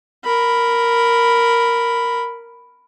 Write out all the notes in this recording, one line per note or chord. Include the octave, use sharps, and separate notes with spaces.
A#4 B5